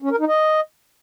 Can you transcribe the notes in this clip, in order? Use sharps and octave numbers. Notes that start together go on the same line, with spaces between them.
C#4
A#4
D#4
D#5